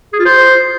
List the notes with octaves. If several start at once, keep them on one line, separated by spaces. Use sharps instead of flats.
G#4
F4
C5